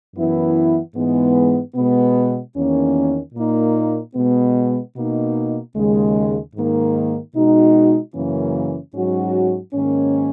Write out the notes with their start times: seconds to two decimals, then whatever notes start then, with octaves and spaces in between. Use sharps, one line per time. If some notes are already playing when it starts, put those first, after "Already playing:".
0.16 F#2 E3 B3 E4
0.95 G#2 E3 G#3 B3
1.76 B2 G#3 B3
2.56 E2 D#3 A#3 C#4
3.35 A#2 A#3 D#4
4.15 B2 G#3 B3
4.95 B2 A#3 D#4
5.75 D#2 C#3 G#3
6.54 G#2 D#3 A#3
7.34 B2 G#3 D#4 F#4
8.14 F#2 C#3 E3 A#3 C#4
8.94 G#2 F#3 C#4 F#4
9.73 G#2 D#3 A#3 C#4